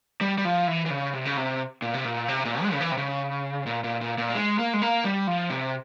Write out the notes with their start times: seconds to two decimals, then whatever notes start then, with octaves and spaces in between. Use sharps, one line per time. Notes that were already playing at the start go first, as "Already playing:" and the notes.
0.21 G3
0.38 G3
0.45 F3
0.68 E3
0.86 E3
0.90 C#3
1.14 C3
1.25 C#3
1.37 C3
1.82 A#2
1.94 C3
2.05 A#2
2.28 C3
2.45 A#2
2.62 G#3
2.73 C#3
2.81 E3
2.91 C3
2.97 C#3
3.66 A#2
3.84 A#2
4.01 A#2
4.18 A#2
4.30 A#3
4.35 G#3
4.59 A#3
4.74 G#3
4.82 A#3
5.04 G3
5.27 F3
5.50 C3